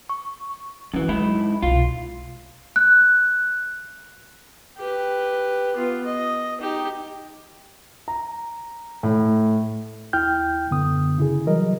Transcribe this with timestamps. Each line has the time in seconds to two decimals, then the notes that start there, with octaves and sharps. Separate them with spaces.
0.09 C#6
0.94 F#2 D3 E3
1.08 G#2 F#3 E4
1.62 C2 B2 F4
2.76 F#6
4.78 G4 B4
5.76 B3 F4
6.06 D#5
6.60 D#4 G4
8.08 A#5
9.03 A2
10.13 D#2 E4 G5 F6 G6
10.71 F#2 D3 B3 D#6
11.18 C#3 E4 G#4
11.46 E3 F#3 G3 A#4 D#5